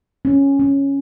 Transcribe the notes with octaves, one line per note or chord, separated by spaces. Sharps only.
C#4
C#4